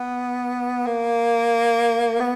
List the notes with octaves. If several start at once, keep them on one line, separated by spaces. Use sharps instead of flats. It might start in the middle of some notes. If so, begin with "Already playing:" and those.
Already playing: B3
A#3
B3